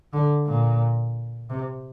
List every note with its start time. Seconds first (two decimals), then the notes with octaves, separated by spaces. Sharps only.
0.13 D3
0.46 A#2
1.50 C3